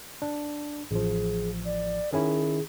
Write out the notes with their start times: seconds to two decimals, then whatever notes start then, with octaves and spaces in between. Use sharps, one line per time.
0.22 D4
0.91 A1 F3 G#4
1.65 D5
2.13 D#3 C#4 E4 G#4